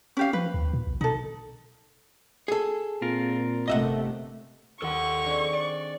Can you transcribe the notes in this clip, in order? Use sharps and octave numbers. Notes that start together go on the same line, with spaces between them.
C#4 G4 F5
F3 B4
D#2
A#2
B1
B2 D#4 A4
G#4 A4
A#2 C4 F4 A#4
G1 C3 A3 D#5 E5 F#5
D#2 A4 F#5 C#6
C4 D4 G#4
D5